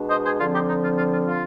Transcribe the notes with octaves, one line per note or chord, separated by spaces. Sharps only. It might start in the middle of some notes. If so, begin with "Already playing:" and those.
Already playing: B2 G#3 D4
C5 D#5
G#4 C5
D3 F3 C4 F4
D#4 G4
D#4
F4
F4
F4
F4